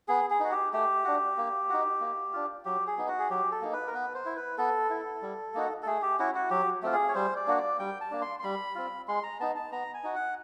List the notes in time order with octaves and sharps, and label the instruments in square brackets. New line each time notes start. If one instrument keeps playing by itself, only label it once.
[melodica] B3 G#4
G#4
D#4 F#4
G4
A3 G4
D4 F#4
A#3
D#4 F#4
A#3
D4 F4
F#3 G4
G#4
B3 D#4
F#4
G#4
F#3 G4
A4
A#3 D#4
B4
A#4
B3 B4
C5
E4
B4
B3 A4
E4
G3
A#3 D#4 F#4
A4
A3 G#4
G4
C#4 E4 F#4
F#4
F#3 G4
A3 C4 F4
G#4
C#5
G3 C5
D5
A#3 D4 F#4
D5
G3 G5
A5
A#3 D4
C6
C6
G3 B5
C4 F4
G#3 C6
A#5
B3 D#4 A5
A5
B3 A#5
G#5
D#4 F#4
F#5